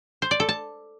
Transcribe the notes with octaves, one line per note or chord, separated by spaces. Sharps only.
C5
D5
A4
A5